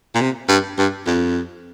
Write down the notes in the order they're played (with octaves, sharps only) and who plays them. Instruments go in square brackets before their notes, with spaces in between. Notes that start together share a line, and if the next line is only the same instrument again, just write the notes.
[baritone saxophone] A#2
C3
G2
G2
F2